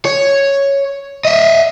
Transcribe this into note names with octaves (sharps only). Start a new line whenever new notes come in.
C#5
D#5 E5